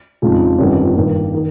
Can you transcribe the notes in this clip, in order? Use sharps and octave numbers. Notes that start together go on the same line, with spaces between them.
F2 C#3 G#3 D#4
G1 F2 D#3 G3 C#4
G2 D#3 A#3
D#3